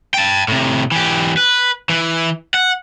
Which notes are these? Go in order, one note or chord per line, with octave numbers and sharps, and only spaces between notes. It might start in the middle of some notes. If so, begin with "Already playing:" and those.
G5 A5
A2 C3
E3 G4
B4
E3
F#5